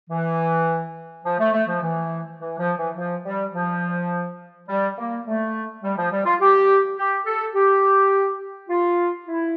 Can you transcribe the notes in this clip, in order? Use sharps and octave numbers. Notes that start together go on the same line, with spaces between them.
E3
F3
A3
A3
F3
E3
E3
F3
E3
F3
G3
F3
G3
A#3
A3
G3
F3
G3
F4
G4
G4
A4
G4
F4
E4